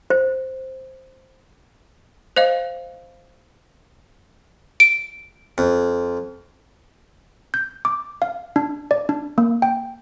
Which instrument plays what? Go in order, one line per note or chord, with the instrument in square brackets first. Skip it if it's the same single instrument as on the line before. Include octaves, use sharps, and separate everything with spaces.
[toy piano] C5
[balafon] C5 D#5 F5
[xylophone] D7
[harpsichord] F2
[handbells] G6
D6
F5
D4
D5
D4
A#3
G5